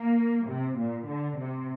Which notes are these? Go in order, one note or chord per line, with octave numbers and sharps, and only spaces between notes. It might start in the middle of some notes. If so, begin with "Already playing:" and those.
Already playing: A#3
C3
A#2
D3
C3